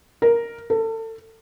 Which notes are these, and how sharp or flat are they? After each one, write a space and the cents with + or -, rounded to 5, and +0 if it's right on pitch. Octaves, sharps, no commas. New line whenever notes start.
A#4 +0
A4 +30